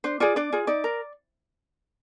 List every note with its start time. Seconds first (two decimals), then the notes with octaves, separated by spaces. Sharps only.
0.04 D4 C5
0.20 F4 G#4 D5
0.36 D4 D5
0.52 F4 G#4
0.67 D#4 D5
0.84 A#4